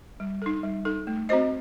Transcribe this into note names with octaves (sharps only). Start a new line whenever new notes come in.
G3
D#4 A4
G3
D#4 A4
A3
C4 F#4 C5 D#5